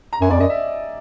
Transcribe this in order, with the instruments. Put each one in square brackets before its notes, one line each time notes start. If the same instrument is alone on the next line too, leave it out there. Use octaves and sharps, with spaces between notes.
[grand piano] A#5
[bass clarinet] F#2 [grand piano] G#5
[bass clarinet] F2 [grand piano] D5
[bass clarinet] F#2 [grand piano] D#5
[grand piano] E5